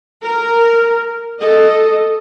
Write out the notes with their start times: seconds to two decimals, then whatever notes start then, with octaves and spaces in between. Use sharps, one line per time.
0.21 A#4
1.41 A4 D#5